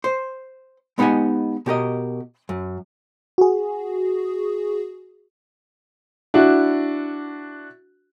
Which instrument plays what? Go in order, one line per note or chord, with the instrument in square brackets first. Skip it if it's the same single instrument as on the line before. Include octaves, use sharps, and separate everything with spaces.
[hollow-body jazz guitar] C5
G#3 B3 D#4 G4 F#5 G#5
B2 G4 A#4 D#5
F#2
[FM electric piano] F#4 G#4
[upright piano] D4 E4 F#4